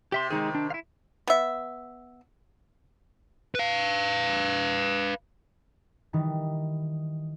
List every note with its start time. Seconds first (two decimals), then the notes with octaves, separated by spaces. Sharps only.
0.12 C3 G4 E5 C6
0.30 C3 D#3 G#3 D#4 G#4
0.55 D4
0.70 E4 F5
1.27 B3 E5
3.55 B4 F5
6.13 D#3 E3 G3 D#4